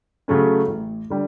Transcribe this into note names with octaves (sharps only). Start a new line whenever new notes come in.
C#3 F#3 A3 C#4
A1
D3 G3